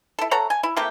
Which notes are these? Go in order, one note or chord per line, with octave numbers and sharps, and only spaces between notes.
E4 A4
A4 C#5 F#5 A#5
G#5
E4
C3 A3 A#3 G4